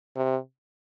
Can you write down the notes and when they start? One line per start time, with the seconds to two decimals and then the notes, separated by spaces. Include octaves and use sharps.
0.17 C3